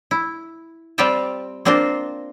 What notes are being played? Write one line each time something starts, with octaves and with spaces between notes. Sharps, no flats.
E4
G3 C4 F4 G4 G5 A5
A#3 C4 D4 F4 A#4 C5